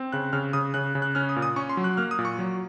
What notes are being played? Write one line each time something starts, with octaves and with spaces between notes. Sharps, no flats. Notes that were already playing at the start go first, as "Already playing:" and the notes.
Already playing: C4
C#3 F#6
C#3 F6
C#3 D#6
C#3 F#6
C#3
F#6
C#4 F6
D#6
A#2
D#6
C#4 C#6
C6
F#3
F#6
A#3 F6
D#6
A#2
C#6
F#3